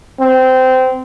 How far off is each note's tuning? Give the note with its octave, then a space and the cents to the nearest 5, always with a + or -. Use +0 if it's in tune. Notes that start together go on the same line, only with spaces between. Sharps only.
C4 -20